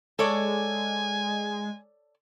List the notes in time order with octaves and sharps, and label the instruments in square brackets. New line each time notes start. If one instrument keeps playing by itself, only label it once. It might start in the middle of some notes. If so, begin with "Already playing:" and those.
[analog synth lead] G#3 [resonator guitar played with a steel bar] A4 C#5 D5 [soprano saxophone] G#5